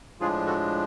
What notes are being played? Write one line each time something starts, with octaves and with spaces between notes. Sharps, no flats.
A2 F3 G#3 D4 F4 G#4
F#4 A4